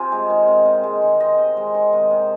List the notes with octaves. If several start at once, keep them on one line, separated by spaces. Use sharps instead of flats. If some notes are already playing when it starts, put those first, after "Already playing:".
Already playing: C3 F4 G#4 A#4 C5
G#3
D#3
C3
C3
G#3
D#3
C3 D#5
C3
G#3
D#3
C3
C3